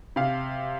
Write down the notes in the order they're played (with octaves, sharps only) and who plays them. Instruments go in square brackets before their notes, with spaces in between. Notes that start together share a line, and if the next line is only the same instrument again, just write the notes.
[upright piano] C3 F5